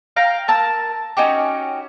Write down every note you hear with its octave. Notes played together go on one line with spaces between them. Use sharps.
F5 G5 A#5
A#4 A5 E6
C#4 D#4 F#4 G4